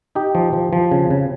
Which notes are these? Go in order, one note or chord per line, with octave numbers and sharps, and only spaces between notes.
D#4 G4
F3
F3
F3
C#3
C#3